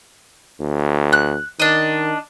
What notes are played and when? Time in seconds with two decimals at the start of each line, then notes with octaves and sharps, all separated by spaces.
0.60 D2
1.13 F#6
1.60 D#3 D4 D#5